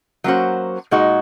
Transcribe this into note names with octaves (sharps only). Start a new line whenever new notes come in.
F#3 A#3 C#4 F#4 C5
A#2 G#3 D#4 F#4